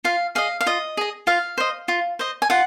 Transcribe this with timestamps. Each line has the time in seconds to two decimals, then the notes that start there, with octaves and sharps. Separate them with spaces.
0.04 F4 F5
0.35 G#4 D#5 F5
0.61 F5
0.66 F4 D#5
0.97 G#4 D#5
1.27 F4 F5
1.58 C5 D#5
1.88 F4
2.19 C5 D#5
2.42 G#5
2.50 F4 F#5